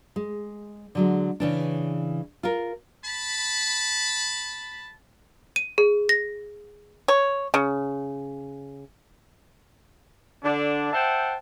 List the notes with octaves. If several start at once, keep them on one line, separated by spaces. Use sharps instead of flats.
G#3
D3 F#3 G#3
C#3 E3 D4
F4 A#4
A5 B5
D#7
G#4
A#6
C#5
C#3
D3 D4
C5 E5 F#5 G5 A5